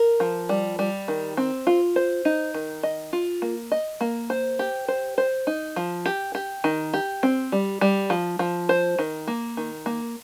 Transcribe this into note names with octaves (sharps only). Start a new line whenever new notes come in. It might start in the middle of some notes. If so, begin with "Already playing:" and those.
Already playing: A#4
F3
G3
G3
D#3
C4
F4
C5
D#4
D#3
D#5
F4
A#3
D#5
A#3
C5
G4
C5
C5
D#4
F3
G4
G4
D#3
G4
C4
G3
G3
F3
F3
C5
D#3
A#3
D#3
A#3